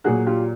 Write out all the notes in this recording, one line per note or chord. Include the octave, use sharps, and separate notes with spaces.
A#2 F#3 F#4 G#4
F4 G4